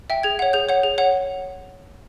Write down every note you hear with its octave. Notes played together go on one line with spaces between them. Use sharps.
E5 G5
G#4 G#6
C#5 F#5
G#4 G6
C#5 F#5
G#4
C#5 F#5